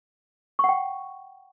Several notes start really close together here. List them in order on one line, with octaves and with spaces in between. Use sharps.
C#6 F#5 G5